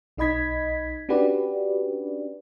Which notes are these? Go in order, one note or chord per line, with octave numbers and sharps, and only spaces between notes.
B1 D#4 D#5 B5 G#6 B6
C#4 D4 F#4 G4 B4 D5